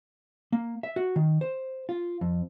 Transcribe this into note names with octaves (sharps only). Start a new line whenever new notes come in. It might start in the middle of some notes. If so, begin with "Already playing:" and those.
A#3
E5
F#4
D#3
C5
F4
F2